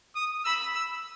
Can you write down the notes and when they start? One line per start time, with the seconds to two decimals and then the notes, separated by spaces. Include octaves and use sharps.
0.16 D#6
0.45 B5 E6
0.75 E6